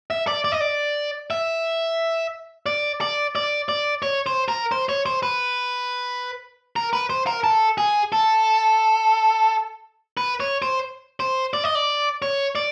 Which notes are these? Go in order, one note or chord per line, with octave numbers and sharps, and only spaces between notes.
E5
D5
D5
D#5
D5
E5
D5
D5
D5
D5
C#5
C5
A#4
C5
C#5
C5
B4
A#4
B4
C5
A#4
A4
G#4
A4
B4
C#5
C5
C5
D5
D#5
D5
C#5
D5